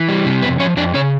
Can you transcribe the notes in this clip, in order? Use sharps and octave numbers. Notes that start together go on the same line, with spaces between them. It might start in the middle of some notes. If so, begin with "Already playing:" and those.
Already playing: E3
G3
C3
F2 B3 B4
F3 C#4 C#5
F2 D4 D5
C#3 C#4 C#5